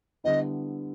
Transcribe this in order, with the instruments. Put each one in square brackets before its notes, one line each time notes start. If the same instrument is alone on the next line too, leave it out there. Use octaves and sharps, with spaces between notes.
[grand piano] D3 G3 B3 E4 [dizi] D#5